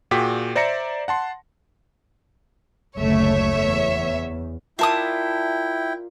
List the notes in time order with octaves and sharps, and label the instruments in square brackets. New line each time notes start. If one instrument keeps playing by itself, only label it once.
[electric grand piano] A#2 F#4 G#4 G5 D6 B6
C5 D5 E5 A#5 A#6 C#7
F#5 A5 C6
[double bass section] F#1 D2 A3 [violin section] C#5 E5
[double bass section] E2
[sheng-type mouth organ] E4 G5 [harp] F4 A#4 D5 [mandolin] E5 A5 D#6